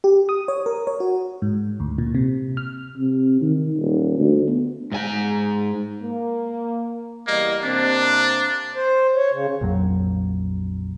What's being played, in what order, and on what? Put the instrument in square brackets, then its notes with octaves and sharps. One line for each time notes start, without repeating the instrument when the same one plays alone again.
[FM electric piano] G4
D#6
C#5
A#4
C#5
F#4
G#2
D2
A#2
C3
F6
[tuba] C3
D#3
D#1
D2
B3
[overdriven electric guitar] G#2 G#5
[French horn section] A#3
[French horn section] E2 G3 D#5 [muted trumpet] A#3
[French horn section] C3 A#3 C4 [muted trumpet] D4
[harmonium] C5
C#5
C#3
[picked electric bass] A#1 F2 F#3